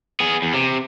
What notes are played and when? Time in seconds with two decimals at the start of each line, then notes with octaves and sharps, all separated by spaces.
0.20 B3 G#4
0.42 E2
0.54 C3